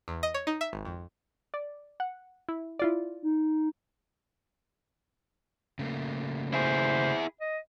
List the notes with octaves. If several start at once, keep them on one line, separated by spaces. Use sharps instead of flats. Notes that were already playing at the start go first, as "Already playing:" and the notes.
E2
D#5
C#5
D#4
E5
G#1
F2
D5
F#5
E4
E4 F4 D5
D#4
C#3 A3 A#3
E4 G#4 C5
D#5